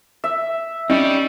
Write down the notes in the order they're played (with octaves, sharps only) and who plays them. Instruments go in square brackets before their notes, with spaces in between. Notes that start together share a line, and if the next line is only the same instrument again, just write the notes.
[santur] E5
[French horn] G3 [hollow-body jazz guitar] C#4 D#4